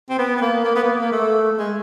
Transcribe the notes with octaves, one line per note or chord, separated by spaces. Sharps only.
C4
B3
B3
A#3
A#3
B3
A#3
A#3
A3
A3
G#3